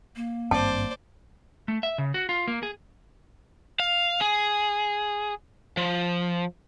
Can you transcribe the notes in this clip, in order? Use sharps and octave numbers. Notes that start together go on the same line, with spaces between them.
A#3
G#1 G2 C4 C5 D5 A5
A3
E5
C#3
F#4
F4
A#3
G#4
F5
G#4
F3